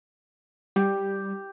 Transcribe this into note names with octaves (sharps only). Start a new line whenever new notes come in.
G3 G4